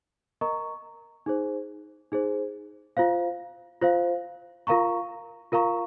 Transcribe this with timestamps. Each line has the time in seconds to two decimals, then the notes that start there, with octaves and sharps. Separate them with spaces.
0.41 A#4 D#5 A#5 C#6
1.26 D#4 G#4 C5
2.12 D#4 G#4 C5
2.97 F4 C5 F5
3.82 F4 C5 F5
4.67 F4 A#4 F5 A#5 C#6
5.52 F4 A#4 F5 A#5 C#6